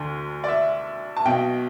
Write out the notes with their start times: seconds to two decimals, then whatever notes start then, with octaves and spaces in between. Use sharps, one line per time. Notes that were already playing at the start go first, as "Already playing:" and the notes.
Already playing: D2 D3
0.44 D5
0.48 E5
1.17 A5
1.25 B1 B2 G5